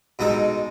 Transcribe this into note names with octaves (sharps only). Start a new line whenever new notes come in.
B2 G#3 D#4 A4